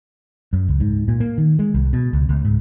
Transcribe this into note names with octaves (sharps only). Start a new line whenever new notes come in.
F#2
C#2
G#2
A#2
A#3
D#3
G#3
C2
B2
C#2
C#2
G#2